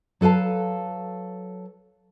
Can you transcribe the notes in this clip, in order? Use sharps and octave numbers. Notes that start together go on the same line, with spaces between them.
F#3 A4 B4 F5 A5